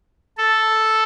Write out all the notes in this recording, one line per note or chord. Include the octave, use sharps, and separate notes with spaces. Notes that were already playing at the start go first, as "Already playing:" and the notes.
A4